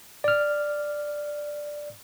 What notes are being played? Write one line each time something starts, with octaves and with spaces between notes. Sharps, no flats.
D5 F6